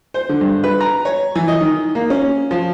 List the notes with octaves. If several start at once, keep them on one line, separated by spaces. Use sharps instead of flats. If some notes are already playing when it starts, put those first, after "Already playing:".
C5
D3
G2
B4
A#5
C#5
E3
D#5
D#3
A#3
C#4
F3